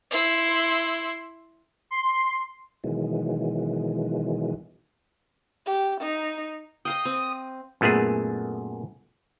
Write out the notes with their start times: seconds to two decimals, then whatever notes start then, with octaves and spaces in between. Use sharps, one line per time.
0.11 E4 C6
1.91 C6
2.84 B2 D#3 E3 F#3 G#3
5.66 G4
6.01 D#4
6.85 D#5 F5 G5 D#6
7.05 C4
7.81 F#2 A#2 A3 B3 G#4